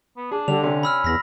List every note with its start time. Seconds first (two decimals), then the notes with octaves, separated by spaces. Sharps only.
0.17 B3
0.32 D4 G#4
0.48 D3 G3 F7
0.63 C3 C#4 D4
0.83 B5 E6 F6
1.04 E2 B5 A#6 B6